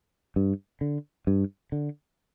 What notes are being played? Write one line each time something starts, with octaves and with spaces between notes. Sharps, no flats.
G2
D3
G2
D3